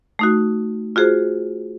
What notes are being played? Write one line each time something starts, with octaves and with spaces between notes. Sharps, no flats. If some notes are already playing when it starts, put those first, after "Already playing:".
A3 D#4 F#4
F4 F#4 G#4 C5